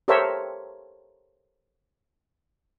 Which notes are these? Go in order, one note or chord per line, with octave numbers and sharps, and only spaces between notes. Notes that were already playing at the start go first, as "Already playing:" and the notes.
G4 A4 A#4 C5 C#5 E5